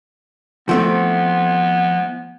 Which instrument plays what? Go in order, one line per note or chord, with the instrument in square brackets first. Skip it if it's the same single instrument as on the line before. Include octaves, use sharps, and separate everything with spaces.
[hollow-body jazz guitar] F3 A3 C4 [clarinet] B3